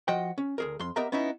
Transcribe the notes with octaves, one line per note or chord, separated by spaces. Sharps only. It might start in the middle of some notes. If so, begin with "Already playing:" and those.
F3 F#4 D#5 F#5 G5
C#4
D2 G#4 A#4
F2 C6
B3 G4 A#4 D#5 E5 A#5
B3 C#4 D#4 E4 E5